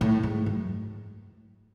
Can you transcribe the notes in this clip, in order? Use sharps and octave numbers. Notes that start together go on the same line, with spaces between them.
A2
G#2
F#2